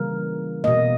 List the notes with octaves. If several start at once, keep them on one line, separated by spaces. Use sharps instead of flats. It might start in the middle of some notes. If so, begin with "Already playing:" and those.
Already playing: C#3 E3 G3 A#3 A#4
B2 A#3 D#5